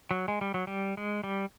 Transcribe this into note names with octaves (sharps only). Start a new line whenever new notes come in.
F#3
G#3
G3
F#3
G3
G#3
G3